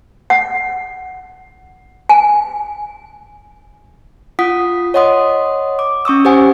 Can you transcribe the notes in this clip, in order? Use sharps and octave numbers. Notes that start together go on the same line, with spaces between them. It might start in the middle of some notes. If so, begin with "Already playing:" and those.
F#5
G#5
F4 F#5 D#6 B6
C#5 D#5 F#5 C6 D#6
D6
C#4 C#6 D#6 E6
G4 C5 F#5 G#5